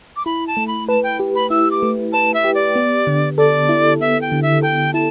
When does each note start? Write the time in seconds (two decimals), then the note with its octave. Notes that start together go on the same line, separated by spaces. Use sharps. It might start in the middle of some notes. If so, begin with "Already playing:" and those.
0.16 D6
0.26 E4 B5
0.47 A5
0.57 A3
0.68 B5
0.88 B4 A5
1.03 G5
1.20 G4
1.35 B5
1.50 E4 E6
1.71 D6
1.83 A3
2.13 B4 A5
2.34 E5
2.44 G4
2.55 D5
2.76 B3
3.07 D3
3.37 A4 D5
3.69 E4
4.01 B3 E5
4.21 G5
4.32 D3
4.42 E5
4.62 A4 G5
4.94 E4 A5